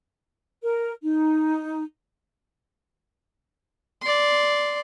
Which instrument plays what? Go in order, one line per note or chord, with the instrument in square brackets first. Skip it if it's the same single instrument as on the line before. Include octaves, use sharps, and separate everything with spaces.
[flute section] A#4
D#4
[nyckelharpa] D5 C6